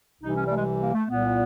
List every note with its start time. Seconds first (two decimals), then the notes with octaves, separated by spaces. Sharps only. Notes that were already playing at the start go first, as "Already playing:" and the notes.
0.22 C2 C3 E3 D#4
0.32 C#4
0.44 G3
0.50 A3
0.54 G#3
0.79 A#3
0.93 A3
1.08 C2 A#2 B3